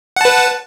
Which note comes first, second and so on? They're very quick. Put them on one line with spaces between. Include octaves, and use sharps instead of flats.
F#5 A5 B4